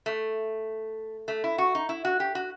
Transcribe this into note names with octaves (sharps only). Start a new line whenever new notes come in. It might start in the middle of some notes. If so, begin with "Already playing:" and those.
A3
A3
E4
F#4
D#4
E4
F#4
G4
F#4